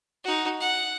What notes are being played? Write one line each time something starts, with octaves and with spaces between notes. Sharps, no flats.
D#4 F#4
F#5